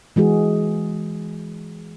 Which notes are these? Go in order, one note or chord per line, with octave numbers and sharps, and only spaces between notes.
E3 G#3 F#4 G#4